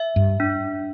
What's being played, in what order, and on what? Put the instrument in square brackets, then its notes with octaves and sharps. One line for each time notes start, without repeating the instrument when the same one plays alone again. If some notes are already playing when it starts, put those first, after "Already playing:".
Already playing: [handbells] E5
[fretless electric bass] G2
[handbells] D4